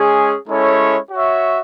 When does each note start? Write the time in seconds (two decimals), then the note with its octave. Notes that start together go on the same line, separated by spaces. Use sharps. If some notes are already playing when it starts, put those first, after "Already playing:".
Already playing: G#3 C#4 G#4
0.48 G#3 C#4 E4 A4 C#5
1.11 F#4 C#5 E5